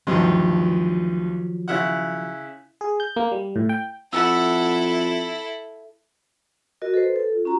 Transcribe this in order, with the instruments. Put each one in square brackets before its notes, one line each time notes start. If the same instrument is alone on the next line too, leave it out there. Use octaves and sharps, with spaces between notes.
[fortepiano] D2 G2 [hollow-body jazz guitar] D#3 F3 F#3
[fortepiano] C#3 E4 F#5
[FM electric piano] G#4
G6
A#3
G3
A2
G5
[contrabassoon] F2 [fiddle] E4 A4 [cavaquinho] E5 F#5 A5
[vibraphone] F#4 A#4 D#5
A4 B4 C5
A4
F4
C#4 F#4 A#5